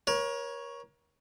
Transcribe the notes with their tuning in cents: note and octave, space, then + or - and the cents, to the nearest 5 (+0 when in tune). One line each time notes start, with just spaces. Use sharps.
A#4 +35 C#5 +0